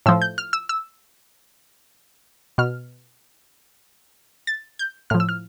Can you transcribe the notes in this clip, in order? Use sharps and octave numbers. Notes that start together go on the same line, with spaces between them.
A2 F3 E6
G6
F6
E6
E6
B2 F6
A6
G6
A2 F3 F6
E6
F6